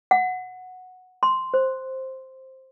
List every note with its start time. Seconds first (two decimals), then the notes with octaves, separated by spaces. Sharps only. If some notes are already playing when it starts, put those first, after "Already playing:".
0.11 F#5
1.23 C6
1.54 C5